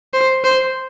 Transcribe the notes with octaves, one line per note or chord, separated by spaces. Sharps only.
C5
C5